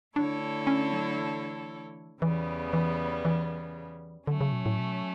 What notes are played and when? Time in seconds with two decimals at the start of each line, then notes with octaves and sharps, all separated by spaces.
0.16 D3 A3 D4 E4 A4 C#5
0.67 C#4
0.93 F#3
1.18 E3
2.21 E2 C#3 E3 G3 B3
2.73 E3
3.25 E3
4.27 D3 F#3 A3 C#4
4.41 C#3
4.52 B2
4.66 A2
4.79 B2